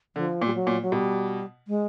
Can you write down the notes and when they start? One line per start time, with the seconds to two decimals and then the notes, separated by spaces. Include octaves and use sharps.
0.16 D3 F3
0.42 A#2
0.46 G3
0.54 F#3
0.67 A#2
0.82 F#3
0.92 B2 G3
1.68 G#3